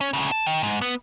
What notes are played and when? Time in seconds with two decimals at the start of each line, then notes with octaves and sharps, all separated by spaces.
0.01 C#4
0.13 D2 C#3
0.32 A5
0.46 D#3
0.63 G#2
0.81 B3